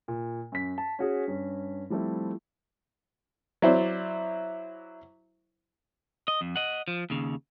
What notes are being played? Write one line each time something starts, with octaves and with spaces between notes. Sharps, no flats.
A#2
F#2 B6
A5
C#4 F#4 G#4
G2 C#4
F3 G3 A3 C4 E4
F#3 E4 C5 D5
D#5
F2
D#5 F#5
F3
D#2 C#3